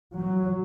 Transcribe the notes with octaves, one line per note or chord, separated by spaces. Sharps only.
F#3